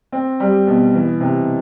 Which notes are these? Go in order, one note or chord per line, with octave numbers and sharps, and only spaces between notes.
C4
G3
B2
E3
C3